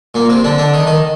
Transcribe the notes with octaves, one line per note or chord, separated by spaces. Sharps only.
A#2 A#3
C3 C4
D3 D4
D3 D4
D#3 D#4
D#3 D#4